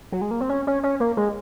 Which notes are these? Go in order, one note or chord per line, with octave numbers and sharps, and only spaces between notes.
F#3
G#3
A#3
C4
C#4
C#4
C#4
A#3
G#3